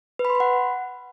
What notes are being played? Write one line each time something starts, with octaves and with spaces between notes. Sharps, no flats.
B4
B5
C6
B5
F#5